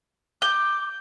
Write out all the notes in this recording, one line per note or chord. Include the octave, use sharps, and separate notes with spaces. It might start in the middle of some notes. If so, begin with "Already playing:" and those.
D6 G6